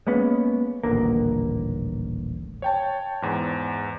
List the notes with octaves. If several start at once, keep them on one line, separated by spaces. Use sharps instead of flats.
G#3 A#3 B3 C#4
D#1 A1 D3 A#3
C#5 G5 A5
E2 G#2